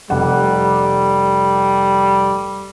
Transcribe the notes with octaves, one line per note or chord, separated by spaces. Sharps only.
F1 G3 F#5